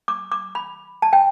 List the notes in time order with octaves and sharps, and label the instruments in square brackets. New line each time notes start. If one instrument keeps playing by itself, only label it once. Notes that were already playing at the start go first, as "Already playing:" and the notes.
[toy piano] D6
D6
B5
A5
G5